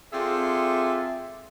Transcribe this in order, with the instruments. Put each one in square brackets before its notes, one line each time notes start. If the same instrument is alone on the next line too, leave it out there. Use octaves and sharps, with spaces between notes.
[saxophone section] C4 F4 G#4 A4 D5 E5